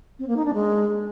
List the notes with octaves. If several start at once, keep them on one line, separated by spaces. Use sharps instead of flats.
C4
A#3
D#4
D4
G#3